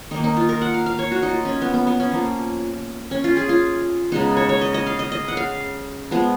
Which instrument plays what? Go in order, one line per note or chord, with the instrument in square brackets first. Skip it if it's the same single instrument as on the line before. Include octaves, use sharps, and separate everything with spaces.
[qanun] D#3 A#3 D#4
D#4
F4
A#4
F#5
F5
F5
C#5
F#4
D#4
F4
C#4
B3
B3
B3
C#4
F3 A#3
C#4
F4
G#4
F4
C#3 G#3 B3 D#4
C#5
C#5
D#5
D#5
F5
D#5
D#5
F#5
F5
F3 G#3 B3